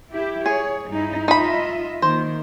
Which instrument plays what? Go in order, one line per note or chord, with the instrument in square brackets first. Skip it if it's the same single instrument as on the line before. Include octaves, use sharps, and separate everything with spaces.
[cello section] E4 G4
[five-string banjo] G#4 [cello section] C#5
[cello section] G2 D#4 E4
[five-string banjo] D#4 B5 [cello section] F4 D#5 E5
[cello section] D#3 A#3 [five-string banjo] C5